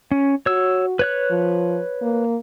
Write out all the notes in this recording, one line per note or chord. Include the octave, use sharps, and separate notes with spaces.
C#4
F#4 C#5 E6
B4 C#5 F#6
F3
A#3